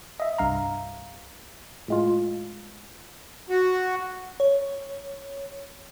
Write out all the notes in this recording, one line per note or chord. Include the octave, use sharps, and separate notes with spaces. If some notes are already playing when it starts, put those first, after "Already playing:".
D#5 E5
C2 G2 F5 A#5
A2 G#3 F4
F#4
C#5